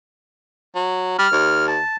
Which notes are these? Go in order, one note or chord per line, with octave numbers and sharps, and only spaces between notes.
F#3
G3 F6
D#2
A5